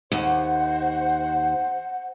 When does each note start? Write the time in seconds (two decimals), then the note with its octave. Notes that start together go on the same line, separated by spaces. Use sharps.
0.12 D#2 C5 F#5